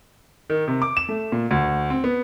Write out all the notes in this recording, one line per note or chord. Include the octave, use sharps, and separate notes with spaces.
D#3
C3
D6
E7
A3
A#2
D2
C4
B3